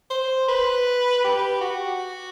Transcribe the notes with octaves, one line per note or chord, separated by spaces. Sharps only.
C5
B4
G4
F#4